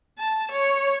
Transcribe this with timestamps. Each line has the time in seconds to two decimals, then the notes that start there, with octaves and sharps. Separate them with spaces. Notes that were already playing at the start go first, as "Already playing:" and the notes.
0.19 A5
0.51 C#5